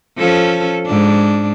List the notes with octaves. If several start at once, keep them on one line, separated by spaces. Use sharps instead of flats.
F3 C#4 A4
G#2 D4